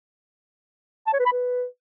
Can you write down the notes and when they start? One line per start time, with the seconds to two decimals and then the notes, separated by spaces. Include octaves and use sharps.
1.07 A5
1.13 C#5
1.19 B4
1.26 B5
1.32 B4